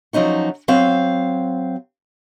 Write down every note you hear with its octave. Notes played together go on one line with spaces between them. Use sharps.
F3 F#3 C#4 D#4 F#4
F#3 C4 F5